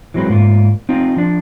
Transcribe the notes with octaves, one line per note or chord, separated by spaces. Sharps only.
E3 F#3 G#3 C4 B4
G#2 A#3 F4
C4 D#4 F4
F3 D4